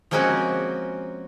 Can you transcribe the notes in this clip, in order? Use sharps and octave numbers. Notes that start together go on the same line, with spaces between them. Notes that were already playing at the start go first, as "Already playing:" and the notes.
F3 G#3 A#3 C4 C#4 F#4